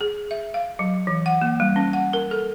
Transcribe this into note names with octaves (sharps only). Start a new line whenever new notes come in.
G#4
E5
F5
F#3
E3
F#5
A#3
G3
C#4
F#5
A#4
A4